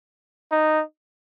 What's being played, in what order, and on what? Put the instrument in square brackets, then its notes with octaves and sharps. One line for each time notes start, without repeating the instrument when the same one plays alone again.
[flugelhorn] D#4